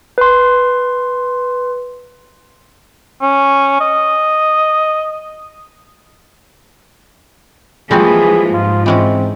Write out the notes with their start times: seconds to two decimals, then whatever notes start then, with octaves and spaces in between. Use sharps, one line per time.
0.18 B4 C6
3.22 C#4
3.81 D#5
7.91 E3 F3 G3 G#3 A#3 C4 F#4 G#4
8.54 G#2 F4
8.86 E3 G#3 C4 C#4